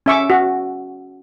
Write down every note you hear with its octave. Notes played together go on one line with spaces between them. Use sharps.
C#4 E5 C#6 D6
F#4